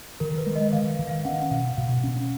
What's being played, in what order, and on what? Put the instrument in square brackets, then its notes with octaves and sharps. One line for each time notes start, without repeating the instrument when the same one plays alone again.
[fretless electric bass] D#3 [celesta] A#4
[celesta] B4
[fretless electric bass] G#3
[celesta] D#5
[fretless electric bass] D#3 [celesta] F5
[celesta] F5
[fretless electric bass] D#3
[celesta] F5
[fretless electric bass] C#4 [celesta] F#5
[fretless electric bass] B2 [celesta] F5
[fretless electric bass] B2
C#4